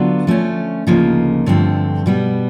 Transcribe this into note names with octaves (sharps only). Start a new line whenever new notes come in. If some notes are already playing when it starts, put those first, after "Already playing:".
Already playing: D3 F#3 B3 D4 F4
F3 A3 C#4
D2 C#3 F3 A#3 D#4
G2 D3 F3 A3 C4
B2 G3 B3